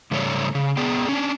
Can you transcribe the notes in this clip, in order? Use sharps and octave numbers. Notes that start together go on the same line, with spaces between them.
G#2 C#3 G3 A3 C#5 D5
C#3
B3 G#4 D5 G5
C#4 D4